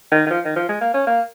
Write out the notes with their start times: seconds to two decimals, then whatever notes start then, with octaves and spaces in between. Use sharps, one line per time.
0.11 D#3
0.27 D#3
0.30 F3
0.45 D#3
0.56 F3
0.69 G#3
0.81 A#3
0.94 C#4
1.07 A#3